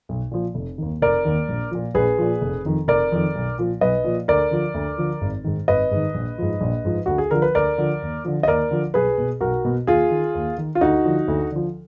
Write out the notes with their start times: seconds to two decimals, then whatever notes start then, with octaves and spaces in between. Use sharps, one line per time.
0.09 B1
0.31 A#2 F3
0.55 F1
0.78 D#2 D#3
1.02 F1 A#4 D5
1.25 D#2 D#3
1.49 A#1
1.71 A#2 F3
1.94 A#1 G#4 B4
2.18 A#2 F3
2.42 F1
2.65 F2 D#3
2.88 F1 A#4 D5
3.12 F2 D#3
3.35 B1
3.58 A#2 F3
3.81 B1 B4 D#5
4.04 A#2 F3
4.28 D2 A#4 D5
4.51 D3 F3
4.74 D2
4.98 D3 F3
5.21 G#1
5.44 G#2 D#3
5.68 G#1 B4 D#5
5.91 G#2 D#3
6.14 A#1
6.38 G#2 F3
6.61 A#1
6.84 G#2 F3
7.06 D2 F#4
7.18 G#4
7.31 D3 F3 A#4
7.42 B4
7.55 D2 A#4 D5
7.78 D3 F3
8.02 D#2
8.25 D3 F3
8.43 D#5
8.48 D#2 A#4 D5
8.71 D3 F3
8.94 B1 G#4 B4
9.18 B2
9.41 B1 F#4 A#4
9.65 B2
9.87 D#2 F4 G#4
10.11 D#3
10.35 D#2
10.58 D#3
10.75 F4
10.81 D2 D#4 F#4
11.05 D3 F3
11.28 D2
11.51 D3 F3